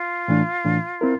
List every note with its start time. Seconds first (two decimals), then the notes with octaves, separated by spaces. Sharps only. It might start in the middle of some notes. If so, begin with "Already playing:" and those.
Already playing: F4
0.28 A2 E3 A3 D4
0.65 A2 E3 A3 D4
1.01 C4 E4 A#4